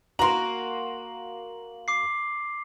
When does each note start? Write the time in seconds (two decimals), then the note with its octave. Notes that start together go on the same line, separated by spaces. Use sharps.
0.19 A#3 F#4 A#5 C6 F#7
1.88 D6 C7